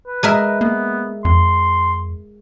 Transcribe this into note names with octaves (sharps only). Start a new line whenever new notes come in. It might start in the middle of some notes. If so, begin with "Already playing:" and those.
B4
G#3 A#4 E5
A#3 B3
F2 C6